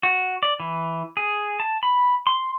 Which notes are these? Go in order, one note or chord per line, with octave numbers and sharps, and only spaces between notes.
F#4
D5
E3
G#4
A5
B5
C6